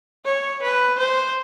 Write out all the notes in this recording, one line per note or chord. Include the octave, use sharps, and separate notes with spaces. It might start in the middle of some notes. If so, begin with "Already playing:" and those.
C#5
B4
C5